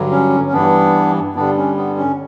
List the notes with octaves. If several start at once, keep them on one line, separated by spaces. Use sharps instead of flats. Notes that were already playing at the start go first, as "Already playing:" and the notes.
Already playing: G2 D3 F#3
C#4
C#4
G2 E3 B3 D4
G2 D3 G3 B3 D4
C#4
B3
C#4